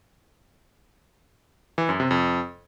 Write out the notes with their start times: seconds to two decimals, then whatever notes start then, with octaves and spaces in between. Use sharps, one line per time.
1.78 E3
1.89 F#2
2.00 C3
2.11 F2